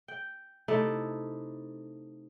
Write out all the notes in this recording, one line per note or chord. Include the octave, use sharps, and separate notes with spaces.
G5
C3 A3 D#4 E4